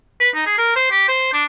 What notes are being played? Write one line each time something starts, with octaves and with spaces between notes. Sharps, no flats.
B4
D#4
G#4
A#4
C5
G4
C5
D4